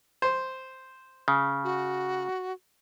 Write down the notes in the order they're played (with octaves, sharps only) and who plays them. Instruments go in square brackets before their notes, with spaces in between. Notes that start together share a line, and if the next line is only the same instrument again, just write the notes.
[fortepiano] C5
[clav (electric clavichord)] C#3
[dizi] F#4